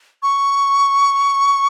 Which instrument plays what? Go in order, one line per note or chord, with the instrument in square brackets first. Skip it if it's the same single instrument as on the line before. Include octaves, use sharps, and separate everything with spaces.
[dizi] C#6